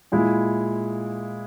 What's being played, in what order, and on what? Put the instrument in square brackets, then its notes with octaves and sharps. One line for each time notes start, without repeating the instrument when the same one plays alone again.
[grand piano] A#2 G#3 E4